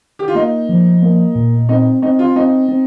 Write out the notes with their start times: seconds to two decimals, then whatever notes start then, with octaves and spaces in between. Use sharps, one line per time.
0.19 G4
0.28 F4
0.35 A#3 D#4
0.69 F3
1.02 A#3
1.35 A#2
1.69 C4 D#4
2.02 C4 D#4
2.19 F4
2.36 C4 D#4
2.69 C4